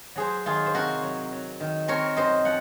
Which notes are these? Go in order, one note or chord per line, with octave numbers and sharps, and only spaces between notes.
F#3 G#4 C5
D#3 F4 G#4
C5
C3 F#4 A#4
F#3
F#3
D#3
C4 A#4 C#5
F#2 C5 D#5
F3 F#5